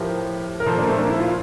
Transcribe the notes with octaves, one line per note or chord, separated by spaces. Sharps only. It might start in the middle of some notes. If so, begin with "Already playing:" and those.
Already playing: A2 F3 G4 A#4
A#4
A#2 F3 A4 C5
A#3 D4
A3 C4
A#3 D4
E4
F4